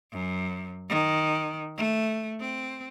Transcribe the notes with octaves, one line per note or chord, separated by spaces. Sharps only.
F#2
D#3
A3
C4